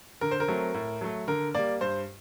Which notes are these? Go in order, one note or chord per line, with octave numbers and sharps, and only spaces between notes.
D3 A#4
C5
A#4
F#3 A3 C4
A2
F#3 A3
D3 A#4
G3 A#3 D5
G2 C5